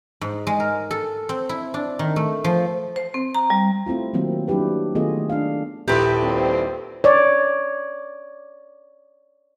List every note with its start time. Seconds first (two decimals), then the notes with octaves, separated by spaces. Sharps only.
0.21 G#2
0.47 G#3
0.60 A#4
0.91 A4
1.29 C4
1.49 E4
1.74 D4
1.99 D#3
2.16 A3
2.44 F3
2.96 C5
3.14 C4
3.34 A#5
3.50 G3
3.86 A3 C4 E4 F4
4.13 D#3 F#3 A#3 C4
4.48 F#3 D4 E4 G4 B4
4.95 D#3 A3 B3 F4 G#4 D#5
5.30 D4 F5
5.88 D#1 A#1 E4 G4 A4 B4 C6
6.22 D#2 G3 C4
7.04 C#5 D5